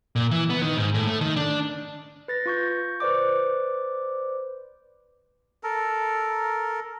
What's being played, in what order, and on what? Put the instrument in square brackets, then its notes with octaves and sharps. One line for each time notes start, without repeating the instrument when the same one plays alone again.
[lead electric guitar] A#2
E3
B3
D#3
G#2
A2
A3
D#3
D4
[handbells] B4 A6 A#6
F4 C#6 G6
B4 C5 D5 D6
[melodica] A4 A#4